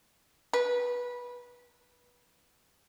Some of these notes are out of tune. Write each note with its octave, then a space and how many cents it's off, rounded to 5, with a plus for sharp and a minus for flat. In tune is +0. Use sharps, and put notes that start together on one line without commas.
B4 -20